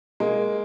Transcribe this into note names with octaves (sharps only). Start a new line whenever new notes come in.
G#3 A#3